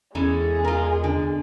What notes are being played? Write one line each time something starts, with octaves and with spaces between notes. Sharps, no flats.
E2 E3 G#3 C#4 G#4 A4
F4 A#4
D3